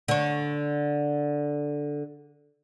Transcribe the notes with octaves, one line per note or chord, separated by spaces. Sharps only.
D3 C#5